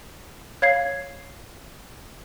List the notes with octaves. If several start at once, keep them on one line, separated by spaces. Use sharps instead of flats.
C#5 F5 G#6 C7